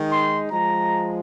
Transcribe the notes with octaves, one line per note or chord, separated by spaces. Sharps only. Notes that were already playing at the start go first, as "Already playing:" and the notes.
Already playing: D#3 G#3 D#4
C6
F3 G#3 A#5